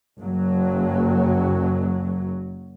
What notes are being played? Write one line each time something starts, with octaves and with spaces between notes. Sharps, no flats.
F#1 F#3